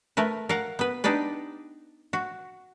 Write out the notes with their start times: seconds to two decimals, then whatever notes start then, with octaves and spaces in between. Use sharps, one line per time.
0.17 A3 A#4 B4
0.49 A#4 F5 F#5
0.79 B3 B4
1.04 D4 D#4 G4 B4 D5
2.13 F#4